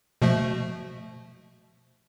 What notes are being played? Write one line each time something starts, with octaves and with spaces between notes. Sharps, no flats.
B2 F3 A3